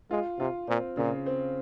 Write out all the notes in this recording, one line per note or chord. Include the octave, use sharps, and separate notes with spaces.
G#3 F4
C3 F4
A#2 C4
A#2 C#3
C4